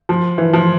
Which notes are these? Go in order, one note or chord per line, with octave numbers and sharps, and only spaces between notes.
F3
E3
F3